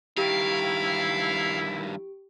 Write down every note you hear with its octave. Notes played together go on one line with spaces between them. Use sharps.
G2 D#3 E4 G4 F5 D7